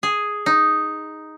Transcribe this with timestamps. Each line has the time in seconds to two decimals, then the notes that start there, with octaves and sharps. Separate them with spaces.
0.03 G#4
0.46 D#4